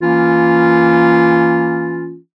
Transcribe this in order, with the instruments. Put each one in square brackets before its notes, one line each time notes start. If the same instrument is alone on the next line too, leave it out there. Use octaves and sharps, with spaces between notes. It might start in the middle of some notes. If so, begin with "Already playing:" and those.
[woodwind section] E3 A#3 C#4 F4